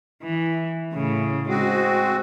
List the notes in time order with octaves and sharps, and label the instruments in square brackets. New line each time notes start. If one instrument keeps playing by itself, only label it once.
[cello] E3
A2 C#3
[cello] G#3 [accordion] C4 F#4